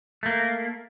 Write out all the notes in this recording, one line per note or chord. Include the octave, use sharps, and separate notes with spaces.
A3 A#3